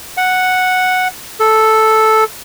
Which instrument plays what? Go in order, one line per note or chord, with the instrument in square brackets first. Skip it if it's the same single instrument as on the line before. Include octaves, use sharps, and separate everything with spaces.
[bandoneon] F#5
A4